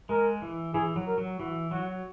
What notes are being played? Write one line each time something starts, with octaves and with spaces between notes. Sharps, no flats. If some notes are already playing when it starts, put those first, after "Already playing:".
G#3 A#4
E3
E3 G#4
F#3
A#4
F#3
E3 F#4
F#3 F#4